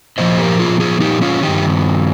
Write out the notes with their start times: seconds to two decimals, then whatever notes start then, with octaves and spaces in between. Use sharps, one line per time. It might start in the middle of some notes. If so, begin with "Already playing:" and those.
0.18 A#2 F3 C5 D#5
0.38 G4 A#4
0.59 F4 G#4
0.80 F4 G#4
1.00 D#4 G4
1.21 C#4 F4
1.42 G2 D#3 D#4 G4